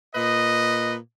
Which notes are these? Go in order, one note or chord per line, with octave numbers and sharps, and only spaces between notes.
A#2 B4 D#5